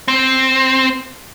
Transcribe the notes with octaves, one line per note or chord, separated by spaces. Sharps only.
C4